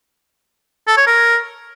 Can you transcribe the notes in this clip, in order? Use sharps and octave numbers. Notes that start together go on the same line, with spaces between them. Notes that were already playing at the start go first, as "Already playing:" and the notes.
A4
C#5
A#4